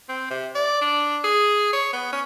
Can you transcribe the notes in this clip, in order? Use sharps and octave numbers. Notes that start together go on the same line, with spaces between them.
C4
C3
D5
D4
G#4
C#5
B3
C#4